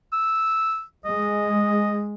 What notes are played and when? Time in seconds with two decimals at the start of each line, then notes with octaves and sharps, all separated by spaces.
0.13 E6
1.05 G#3 D#5